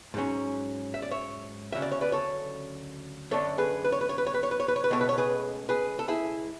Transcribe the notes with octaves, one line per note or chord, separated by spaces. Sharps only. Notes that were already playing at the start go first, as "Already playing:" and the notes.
G#2 F#3 C#4
E5
D5
C#5 E5
D2 C#3 F#3 C#4 E5
D5
C#5
B4 D5
A4 C#5
F#2 D3 A3 D4 A4 C#5
G#4 B4
B4
C#5
B4
C#5
B4
C#5
B4
C#5
B4
C#5
B4
C#5
B4
C#2 B2 A3 C#5
B4
C#5
G#4 B4
G#4 B4
A4
E4 G#4